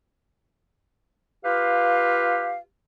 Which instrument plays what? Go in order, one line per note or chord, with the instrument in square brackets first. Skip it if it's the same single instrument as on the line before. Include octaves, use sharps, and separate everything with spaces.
[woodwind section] F4 G4 B4 F5